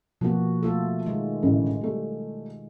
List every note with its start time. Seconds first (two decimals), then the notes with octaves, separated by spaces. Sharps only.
0.21 B2 F3 A#3 B3 F#4
0.63 A3 F4 A4
1.06 D#3 G#3
1.43 A1 D3 C#4
1.81 G3 A3